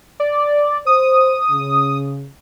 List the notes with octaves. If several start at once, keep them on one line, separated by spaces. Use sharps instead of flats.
D5
C5 D#6
C#3